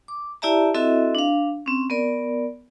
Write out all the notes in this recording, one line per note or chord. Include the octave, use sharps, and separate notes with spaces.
D6
E4 G4 D5 E5 A5 A#5
C4 E4 F#4 A4 D#5 E5
D4 F5
C4 C#4
B3 A#4 D5